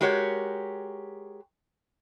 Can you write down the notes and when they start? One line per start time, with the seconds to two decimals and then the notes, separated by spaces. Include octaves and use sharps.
0.01 G#3 F#4 G4 A#4 C#5